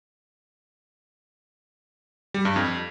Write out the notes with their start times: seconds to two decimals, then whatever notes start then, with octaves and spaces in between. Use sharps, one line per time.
2.34 G3
2.45 G2
2.56 F2